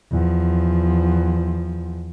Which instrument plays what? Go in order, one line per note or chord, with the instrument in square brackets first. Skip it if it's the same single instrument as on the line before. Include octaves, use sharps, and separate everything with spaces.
[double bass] E2 F3